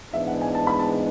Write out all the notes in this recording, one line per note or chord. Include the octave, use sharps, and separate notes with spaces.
G#2 E3 G#3 B3 D4 E5
F#5
G#5
A5
B5
A5